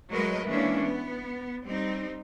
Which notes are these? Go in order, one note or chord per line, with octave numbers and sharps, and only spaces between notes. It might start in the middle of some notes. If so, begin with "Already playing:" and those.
F#3 G#3 A3 A#4 B4 D#5
E3 G#3 A#3 C#4 D4
B3
G3 C4 D#4